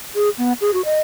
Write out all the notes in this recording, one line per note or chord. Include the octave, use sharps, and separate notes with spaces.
G#4
B3
G#4
F#4
D#5